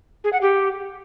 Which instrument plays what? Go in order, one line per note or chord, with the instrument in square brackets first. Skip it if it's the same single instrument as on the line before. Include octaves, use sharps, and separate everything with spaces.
[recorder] G#4
F#5
G4